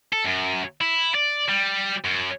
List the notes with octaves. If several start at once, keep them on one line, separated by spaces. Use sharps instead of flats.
A4
F#2
E4
D5
G3
F#2